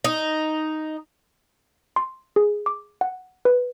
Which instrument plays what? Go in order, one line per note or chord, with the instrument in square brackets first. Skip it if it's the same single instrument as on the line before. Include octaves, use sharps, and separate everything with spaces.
[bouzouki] D#4
[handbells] C6
G#4
D6
F#5
B4